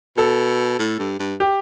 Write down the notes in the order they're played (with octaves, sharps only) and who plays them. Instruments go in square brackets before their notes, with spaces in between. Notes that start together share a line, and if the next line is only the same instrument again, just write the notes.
[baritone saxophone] B2 [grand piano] A4
[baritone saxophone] A2
G2
G2
[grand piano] G4